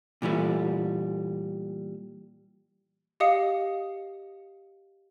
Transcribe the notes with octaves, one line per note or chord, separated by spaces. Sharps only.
A#2 E3 G3 A3
G4 D#5 F5 D#6 C#7